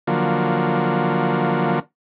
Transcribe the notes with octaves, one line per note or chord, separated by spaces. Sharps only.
D3 F3 F#3 A#3